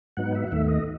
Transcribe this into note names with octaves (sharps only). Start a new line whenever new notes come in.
G#2 F#3 B3 D#4 F#5
E5
F#5
D#2 D#3 A3 E5
D#5